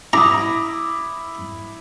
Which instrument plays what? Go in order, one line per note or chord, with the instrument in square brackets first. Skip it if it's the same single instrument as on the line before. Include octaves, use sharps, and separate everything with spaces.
[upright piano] E4 [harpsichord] A#5 [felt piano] D6 D#6